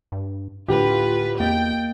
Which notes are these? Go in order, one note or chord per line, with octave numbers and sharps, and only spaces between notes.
G2
D2 A2 D3 A3 F4 G4 B4
E2 A#3 D#5 G5 A6